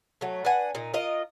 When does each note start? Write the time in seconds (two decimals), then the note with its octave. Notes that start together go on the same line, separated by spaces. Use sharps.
0.21 F#3 A3
0.45 D4 B4 F#5 G#5
0.75 A#2 D#4
0.94 F4 A#4 D#5